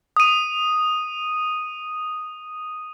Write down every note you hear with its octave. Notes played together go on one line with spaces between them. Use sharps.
D#6 D#7